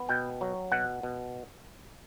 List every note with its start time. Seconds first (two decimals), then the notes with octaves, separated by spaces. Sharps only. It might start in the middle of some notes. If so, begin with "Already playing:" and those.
Already playing: B3
0.09 B2 G5
0.41 F#3
0.72 B2 F#5
1.03 B2